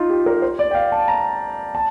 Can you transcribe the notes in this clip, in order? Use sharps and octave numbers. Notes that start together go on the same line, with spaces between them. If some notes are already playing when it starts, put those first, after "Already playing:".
Already playing: D#4 F4
G4
A#4
C5
D5
G5
F5
A5
A#5
A5